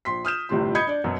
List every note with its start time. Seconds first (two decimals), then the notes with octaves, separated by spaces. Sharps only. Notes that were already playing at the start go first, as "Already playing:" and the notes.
0.05 A#1 C6 B6
0.25 D#6 F6 G6 E7
0.49 G1 A2 C3 G3 F4 C6
0.75 D#5 B5 D#6 G6 G#6 C#7
0.87 D4 D5
1.04 F#2 B2 F#3